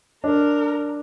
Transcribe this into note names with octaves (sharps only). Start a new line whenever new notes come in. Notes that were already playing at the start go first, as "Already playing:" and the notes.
D4 A#4